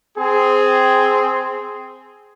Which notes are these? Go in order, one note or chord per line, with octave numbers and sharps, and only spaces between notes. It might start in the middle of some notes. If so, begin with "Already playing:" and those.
C4 G#4